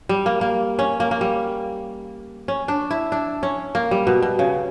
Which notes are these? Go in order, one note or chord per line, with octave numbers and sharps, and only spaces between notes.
G3
A#3
A#3
C#4
A#3
A#3
G3
C#4
D4
E4
D4
C#4
A#3
G3
B2
B2
C#3